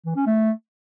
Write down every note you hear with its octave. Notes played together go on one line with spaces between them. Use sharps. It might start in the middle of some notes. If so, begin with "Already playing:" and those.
E3
C#4
A3